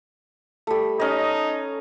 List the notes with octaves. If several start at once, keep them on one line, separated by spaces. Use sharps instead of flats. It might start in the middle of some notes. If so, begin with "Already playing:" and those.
G3 A3
C#4 D#4 D#5